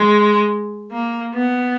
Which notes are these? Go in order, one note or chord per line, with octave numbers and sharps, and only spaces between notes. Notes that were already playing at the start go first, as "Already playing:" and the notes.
Already playing: G#3
A#3
B3